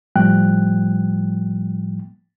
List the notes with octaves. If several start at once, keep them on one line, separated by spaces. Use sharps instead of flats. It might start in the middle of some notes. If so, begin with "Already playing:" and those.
A2 F3 G3 G5 F#6